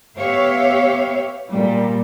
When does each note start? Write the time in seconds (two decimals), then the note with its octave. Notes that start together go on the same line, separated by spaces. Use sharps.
0.17 B3 G4 C#5 E5 F5
1.50 A#2 G3